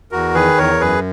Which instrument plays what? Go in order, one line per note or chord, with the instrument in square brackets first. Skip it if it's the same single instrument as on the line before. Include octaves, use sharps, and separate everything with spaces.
[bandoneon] E2 F#4 A#4
D#3 G#4 B4
E2 A#4 C#5
F#2 G#4 B4